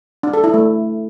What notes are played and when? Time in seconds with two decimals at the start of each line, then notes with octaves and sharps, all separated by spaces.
0.23 D4
0.34 A4
0.44 E4
0.54 A3